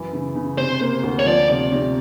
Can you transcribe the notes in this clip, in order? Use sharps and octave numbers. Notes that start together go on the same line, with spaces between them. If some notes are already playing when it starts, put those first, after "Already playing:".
Already playing: F#2 E3
C#3
C#3
C3 C5
A#3
D2
C#5
F3 D5
C3
C3